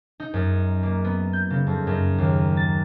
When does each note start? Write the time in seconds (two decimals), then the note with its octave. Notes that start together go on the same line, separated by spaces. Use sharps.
0.20 D#4
0.34 F#2
0.83 A#3
1.05 B3
1.33 G6
1.50 C#3
1.67 F2
1.87 F#2
2.18 D#2
2.57 A6